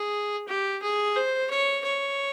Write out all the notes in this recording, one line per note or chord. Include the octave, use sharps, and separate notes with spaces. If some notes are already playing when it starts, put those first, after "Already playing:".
Already playing: G#4
G4
G#4
C5
C#5
C#5